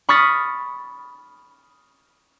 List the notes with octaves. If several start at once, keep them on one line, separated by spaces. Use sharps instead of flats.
B5 C#6 D#6 F6 A6 B6